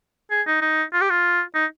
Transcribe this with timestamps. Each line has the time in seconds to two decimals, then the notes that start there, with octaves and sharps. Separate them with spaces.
0.31 G#4
0.47 D#4
0.62 D#4
0.93 F4
1.01 G4
1.10 F4
1.55 D#4